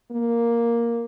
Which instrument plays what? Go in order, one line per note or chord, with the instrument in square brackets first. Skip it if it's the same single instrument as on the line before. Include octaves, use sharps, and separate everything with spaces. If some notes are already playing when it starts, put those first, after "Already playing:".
[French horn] A#3